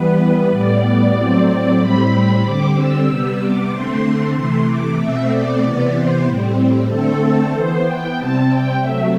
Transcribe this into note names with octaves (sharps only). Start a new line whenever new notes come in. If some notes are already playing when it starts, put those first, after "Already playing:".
Already playing: E3 G3 B3 B4
A2 G3 B3 D5
A2 F#3 C4
D5
A2 G3 C4 B5
D3 G3 C4 D6
E6
C3 G3 B3
D6
D3 A3 C4 C6
C3 E3 A3 C6
D6
B2 A3 C4 E5
D5
C3 E3 B3
C5
A2 G3 C4
D3 A3 C4 A4
E3 B3 C5
G5
C3 G3 C4 A5
G5
C3 F#3 A3 E5